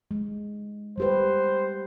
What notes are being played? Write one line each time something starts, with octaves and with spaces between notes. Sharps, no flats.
G#3
G3 G4 B4 C5